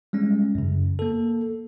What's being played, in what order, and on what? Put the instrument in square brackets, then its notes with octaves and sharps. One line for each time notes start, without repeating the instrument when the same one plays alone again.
[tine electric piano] G3 G#3 C#4
F#2 C#3
A#3 A4